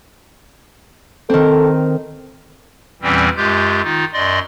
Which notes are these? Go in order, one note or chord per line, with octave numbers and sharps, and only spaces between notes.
D#3 C4 A4
E2 A#2 E3 G3 C4 C#4
F#2 G#3 F4 G4 G6
D#3 D#4 F4
F#2 D5 D#5 C6